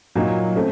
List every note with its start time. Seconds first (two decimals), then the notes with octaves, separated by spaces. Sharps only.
0.15 A#2 F#3 A#3 D#4
0.56 C#3 A3 C4